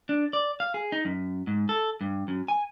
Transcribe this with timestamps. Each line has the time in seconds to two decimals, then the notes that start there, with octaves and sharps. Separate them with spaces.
0.09 D4
0.33 D5
0.60 F5
0.74 G#4
0.92 D#4
1.05 F#2
1.47 G#2
1.69 A4
2.01 G2
2.28 F#2
2.48 G#5